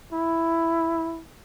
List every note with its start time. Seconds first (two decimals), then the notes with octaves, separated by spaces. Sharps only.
0.12 E4